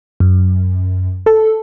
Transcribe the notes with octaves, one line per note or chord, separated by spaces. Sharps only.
F#2
A4